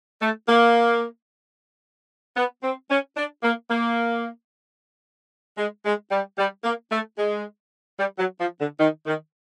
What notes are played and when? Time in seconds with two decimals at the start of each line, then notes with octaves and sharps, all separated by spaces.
0.21 A3
0.48 A#3
2.36 B3
2.63 C4
2.89 C#4
3.16 D4
3.43 A#3
3.70 A#3
5.57 G#3
5.85 G#3
6.11 G3
6.37 G3
6.64 A#3
6.91 A3
7.18 G#3
7.98 G3
8.18 F#3
8.39 F3
8.59 D3
8.79 D#3
9.06 D#3